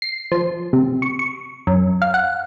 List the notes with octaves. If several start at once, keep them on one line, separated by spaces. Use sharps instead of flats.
C7
F3
C3
C#6
C#6
F#2
F5
F#5